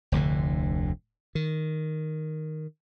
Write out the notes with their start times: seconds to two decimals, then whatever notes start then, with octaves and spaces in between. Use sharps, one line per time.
0.12 F1 D2 A2 D3
1.35 D#3